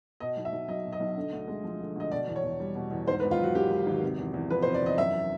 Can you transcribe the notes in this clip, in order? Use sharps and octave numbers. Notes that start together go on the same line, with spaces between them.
B2 D#5
B1
E5
B1
F#3 D#5
B2
D#5
B1
D3
D2
G#3
F3
D3
D2 D#5
B2 D5
E2
C#5
E2
G3
B2
E2
G#2 C5
B4
G#1
F4
F#3 F#4
D#3 G4
G#2
G#1
C3
E2
E2
F3 B4
C5
C3
D5
E2 D#5
F#2 E5